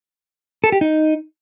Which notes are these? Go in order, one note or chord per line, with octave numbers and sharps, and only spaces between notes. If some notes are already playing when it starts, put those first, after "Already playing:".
A4
G4
D#4